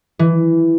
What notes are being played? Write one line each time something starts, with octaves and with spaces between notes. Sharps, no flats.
E3